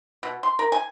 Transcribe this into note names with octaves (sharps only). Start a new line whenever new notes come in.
B2
C6
A#4
G#5